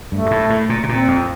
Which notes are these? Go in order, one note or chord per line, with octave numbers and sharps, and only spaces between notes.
G2 A3
G2
A2
A2
A#2
C3
A#2 C4
F2